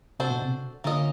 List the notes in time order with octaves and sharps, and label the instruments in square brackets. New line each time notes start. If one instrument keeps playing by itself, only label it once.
[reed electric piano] C3 [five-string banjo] D4 F#4 A4 C5
[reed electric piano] B2
C3
[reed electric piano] D3 [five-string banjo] A#3 C#4 F4 A#4 D#5